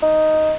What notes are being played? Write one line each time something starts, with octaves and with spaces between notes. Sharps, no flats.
D#4